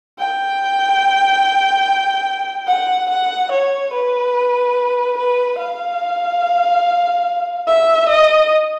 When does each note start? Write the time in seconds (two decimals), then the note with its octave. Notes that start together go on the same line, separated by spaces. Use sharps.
0.19 G5
2.68 F#5
3.10 F#5
3.51 C#5
3.93 B4
5.18 B4
5.59 F5
7.67 E5
8.09 D#5